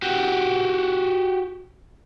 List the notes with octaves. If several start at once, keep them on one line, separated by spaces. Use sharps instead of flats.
F#4 G4